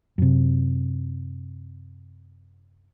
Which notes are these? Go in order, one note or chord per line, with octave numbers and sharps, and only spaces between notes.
F#2 C3